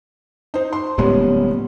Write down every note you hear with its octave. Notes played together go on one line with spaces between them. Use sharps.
D#4 C5
C6
D1 A#2 G3 G#3 B3 C#4